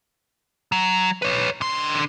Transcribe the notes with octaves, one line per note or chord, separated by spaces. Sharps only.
F#3
B4 C#5
D3 C6